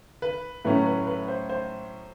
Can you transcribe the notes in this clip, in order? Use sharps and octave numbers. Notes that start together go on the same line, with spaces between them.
B4
A2 F#3 A3 C#4 B4
B4
B4
C5
C5